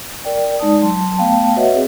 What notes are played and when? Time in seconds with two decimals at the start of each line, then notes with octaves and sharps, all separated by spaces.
0.25 A#4 D5 G5
0.59 G#3 D#4 D5 A5 D#6
0.82 F#3 A5 C6
1.18 A3 B3 F5 G5 A5
1.56 F#4 B4 C#5 D#5 E5 F#5
1.74 C4 G#4